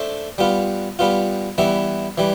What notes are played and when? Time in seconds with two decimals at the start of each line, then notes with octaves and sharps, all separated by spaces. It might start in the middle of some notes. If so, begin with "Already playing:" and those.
Already playing: A3 D4 A4 C5
0.38 G3 B3 F4
0.99 G3 B3 F4
1.58 E3 G3 B3 E4
2.18 E3 G3